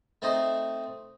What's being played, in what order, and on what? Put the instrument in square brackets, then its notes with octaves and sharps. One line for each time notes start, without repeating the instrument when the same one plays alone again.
[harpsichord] A3 C4 D#4 C5 D#5